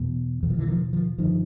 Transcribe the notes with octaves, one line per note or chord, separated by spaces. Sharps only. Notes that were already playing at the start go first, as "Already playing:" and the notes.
Already playing: E2 B2
E2 B2 E3
F3
D3 E3
D#3 F3
D#3 F3
G2 D3 D#3 F3